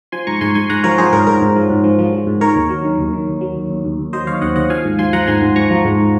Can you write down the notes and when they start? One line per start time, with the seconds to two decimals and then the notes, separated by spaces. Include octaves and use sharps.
0.12 F3 G#5 C6
0.27 G#2 A#5 C#6
0.41 G#2 G#5 C6
0.55 G#2 G#5 C6
0.70 G#2 F#5 A#5
0.84 F3 A#4 C#5
0.98 F3 G#4 C5
1.13 G#2 A#4
1.27 G#2 A#4
1.41 G#2
1.56 F3
1.70 G#2
1.84 F3
1.99 F3
2.13 F3
2.27 G#2
2.41 D#3 A#4 C#5
2.56 D#2
2.70 F#3
2.84 D#3
2.99 D#2
3.13 D#3
3.27 D#2
3.41 F#3
3.56 D#2
3.70 D#2
3.84 D#2
3.99 D#2
4.13 F#3 C5 D#5
4.27 D#2 C#5 F5
4.41 D#2 D#5 F#5
4.56 D#2 D#5 F#5
4.70 F3 F5 G#5
4.85 G#2
4.99 F3 G#5 C6
5.13 F3 F#5 A#5
5.27 G#2 G#5 C6
5.42 G#2
5.56 F3 A#5 C#6
5.70 F3
5.85 G#2